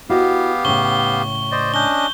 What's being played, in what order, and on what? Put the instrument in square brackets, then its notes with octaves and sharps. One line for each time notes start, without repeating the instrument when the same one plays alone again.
[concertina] B3 G4 F5 [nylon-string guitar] E4 F#4 D#5
[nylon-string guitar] A2 C#3 [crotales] C#6 G7
[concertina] C5 D5 D#5
[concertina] C#4 D4 D#5 [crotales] G6 G7